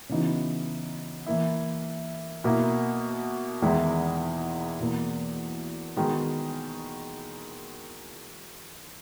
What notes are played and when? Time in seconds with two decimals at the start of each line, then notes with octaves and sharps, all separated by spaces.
0.09 C#3 E3 B3 D#4 F#4
1.27 E3 A#3 E4
2.44 B2 A#3 E4
3.62 E2 D#3 G#3 B3 E4
4.79 E2 B2 A#3
5.96 D#3 G#3 B3 F#4